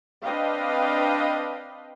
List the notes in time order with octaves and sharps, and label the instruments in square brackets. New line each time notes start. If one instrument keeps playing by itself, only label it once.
[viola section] C4 D4 B4 D#5 F5 G5